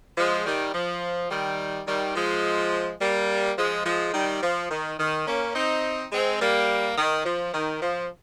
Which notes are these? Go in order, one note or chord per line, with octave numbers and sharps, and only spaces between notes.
F3 G#3
D#3 G3
F3
D#3 G3
D#3 G3
F3 G#3
G3 A#3
F3 G#3
F3 G#3
D#3 G3
F3
D#3
D#3
A#3 C#4
C4 D#4
G#3 C4
G3 A#3
D#3
F3
D#3
F3